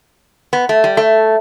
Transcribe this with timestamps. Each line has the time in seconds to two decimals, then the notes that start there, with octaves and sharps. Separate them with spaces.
0.53 B3
0.69 A3
0.84 G3
0.97 A3